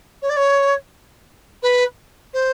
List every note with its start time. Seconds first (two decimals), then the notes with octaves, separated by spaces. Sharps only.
0.22 C#5
0.29 D5
0.36 C#5
1.62 B4
2.33 C5